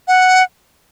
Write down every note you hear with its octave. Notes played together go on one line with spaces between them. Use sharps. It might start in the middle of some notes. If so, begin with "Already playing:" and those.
F#5